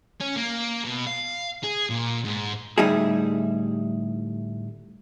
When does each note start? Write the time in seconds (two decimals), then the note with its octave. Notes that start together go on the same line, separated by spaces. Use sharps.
0.21 C#4
0.37 A#3
0.84 B2
1.07 F5
1.63 G#4
1.90 A#2
2.25 G#2
2.78 D2 A2 G3 D#4 E4 G#4